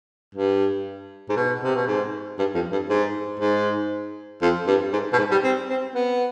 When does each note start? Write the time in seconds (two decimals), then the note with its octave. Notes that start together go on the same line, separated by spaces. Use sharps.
0.35 G2
1.29 G#2
1.37 B2
1.64 C3
1.76 B2
1.87 G#2
2.39 G2
2.55 F2
2.72 G2
2.90 G#2
3.40 G#2
4.42 F2
4.67 G2
4.93 G#2
5.13 B2
5.18 G#2
5.31 G3
5.44 C4
5.69 C4
5.95 B3